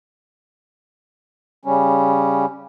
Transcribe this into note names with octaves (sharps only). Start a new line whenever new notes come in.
C#3 G3 C#4